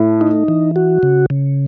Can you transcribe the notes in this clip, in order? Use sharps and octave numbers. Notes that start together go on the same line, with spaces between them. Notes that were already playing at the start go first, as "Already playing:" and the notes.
Already playing: A2 A3
D#4
E3
F#4
C#3
C#3